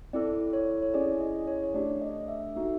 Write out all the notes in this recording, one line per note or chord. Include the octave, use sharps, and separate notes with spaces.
C4 E4 A4 D5
C#5
C#5
C#4 E4 G#4 D5
D#5
C#5
C#5
A3 D4 G4 D5
D#5
E5
A#3 D#4 F#4 A4 E5